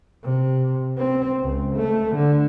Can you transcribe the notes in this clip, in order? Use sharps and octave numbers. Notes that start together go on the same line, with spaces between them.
C3
C4
C#2
A3
D3